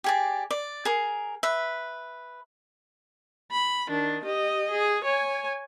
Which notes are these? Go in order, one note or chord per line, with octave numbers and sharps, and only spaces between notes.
G4 G#4 D5
D5
G#4 A#4
B4 E5
B5
D#3 D4
G4 D#5
G#4
C#5 G#5